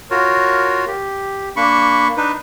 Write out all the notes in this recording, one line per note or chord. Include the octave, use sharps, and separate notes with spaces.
F4 F#4 A#4 C#5
G4
A#3 D4 B5 C#6
D4 D#4 B4